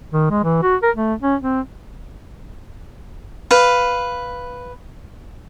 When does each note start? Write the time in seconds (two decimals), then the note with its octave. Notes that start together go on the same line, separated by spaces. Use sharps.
0.13 D#3
0.30 G#3
0.44 E3
0.63 F#4
0.82 A#4
0.95 A3
1.22 C#4
1.41 C4
3.51 B4 F5